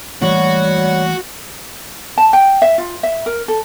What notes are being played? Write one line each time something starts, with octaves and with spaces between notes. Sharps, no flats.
E3 G3 A3 A#3 F#4 C#5
A5
G5
E5
F4
E5
A#4
A4